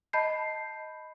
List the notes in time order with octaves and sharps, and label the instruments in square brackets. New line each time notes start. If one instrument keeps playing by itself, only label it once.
[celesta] D#5 A5 B5 G6 C7